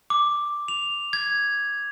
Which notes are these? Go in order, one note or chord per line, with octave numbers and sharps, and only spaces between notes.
D6
F7
G#6